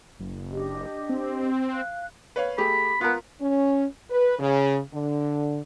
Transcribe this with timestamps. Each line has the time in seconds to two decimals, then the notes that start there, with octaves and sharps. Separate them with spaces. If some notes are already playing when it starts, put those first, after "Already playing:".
0.20 F#1
0.51 D4 G4 D#5
1.09 C4
1.73 F5 F#6
2.36 B4 C#5 F5
2.58 A3 G4 G#4 B5
3.01 B3 F4 A#4
3.41 C#4
4.11 B4
4.39 C#3
4.93 D3